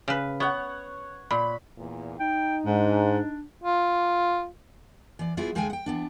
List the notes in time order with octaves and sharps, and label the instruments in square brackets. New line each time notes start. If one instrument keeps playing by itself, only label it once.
[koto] C#3 B4
[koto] B3 [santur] C#5 F#5
[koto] A#2 [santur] B5
[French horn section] E2 A#2
[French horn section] D#4 [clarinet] G5
[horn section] G#2 [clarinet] D4
[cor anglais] F4
[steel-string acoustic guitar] E3 D5
F#3 B3 E4 F4 G#4
D2 G#3 G#4 F5 G5 G#5
F#5 G5
E3 B3 D4